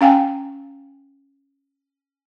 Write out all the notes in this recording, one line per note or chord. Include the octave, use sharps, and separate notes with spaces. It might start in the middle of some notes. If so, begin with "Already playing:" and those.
C#4 F5 G5 G#5